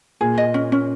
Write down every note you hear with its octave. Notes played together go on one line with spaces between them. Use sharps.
A#2 G#4
D#5
C#4
C#4